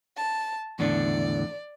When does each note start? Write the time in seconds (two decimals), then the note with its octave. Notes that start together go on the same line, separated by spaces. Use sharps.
0.17 A5
0.79 E2 A2 D3 D5